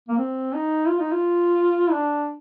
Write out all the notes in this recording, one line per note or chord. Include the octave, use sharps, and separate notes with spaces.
A#3
C4
D#4
F4
D#4
F4
D4